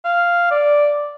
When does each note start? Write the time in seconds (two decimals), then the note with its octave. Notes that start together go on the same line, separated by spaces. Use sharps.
0.05 F5
0.51 D5